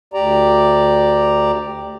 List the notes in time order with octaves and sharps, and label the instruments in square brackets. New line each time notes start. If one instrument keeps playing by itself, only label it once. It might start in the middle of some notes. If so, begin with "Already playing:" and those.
[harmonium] D2 G4 D5 A#5